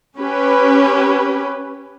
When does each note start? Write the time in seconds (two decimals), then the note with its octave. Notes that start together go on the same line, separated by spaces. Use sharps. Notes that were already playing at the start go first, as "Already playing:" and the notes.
0.16 C#4 G4 B4